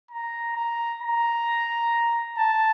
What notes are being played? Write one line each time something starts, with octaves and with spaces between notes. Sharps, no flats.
A#5
A#5
A#5
A5